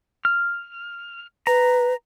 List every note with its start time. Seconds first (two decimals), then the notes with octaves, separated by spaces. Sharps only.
0.25 F6
1.47 B4 A#5